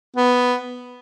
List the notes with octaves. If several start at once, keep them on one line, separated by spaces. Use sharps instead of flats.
B3